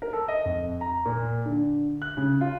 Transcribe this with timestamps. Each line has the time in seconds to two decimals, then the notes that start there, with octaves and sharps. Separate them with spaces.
0.02 A#4
0.13 A4
0.28 D#5
0.45 F2
0.81 A#5
1.05 A#2
1.46 D3
2.02 F#6
2.17 C#3
2.41 F4